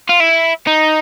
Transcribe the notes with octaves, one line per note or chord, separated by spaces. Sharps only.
F4
E4
D#4